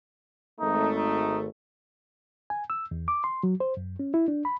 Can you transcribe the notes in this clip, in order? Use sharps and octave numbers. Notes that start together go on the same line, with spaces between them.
G#1 A3 D#4
D#4
G#5
E6
E2
D6
C6
F#3
C5
F#2
C#4
E4
D4
B5